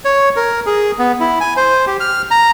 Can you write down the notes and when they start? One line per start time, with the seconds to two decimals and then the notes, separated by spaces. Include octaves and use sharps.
0.05 C#5
0.36 A#4
0.66 G#4
0.99 B3
1.20 E4
1.40 G#5
1.57 C5
1.87 G4
2.00 F6
2.31 A#5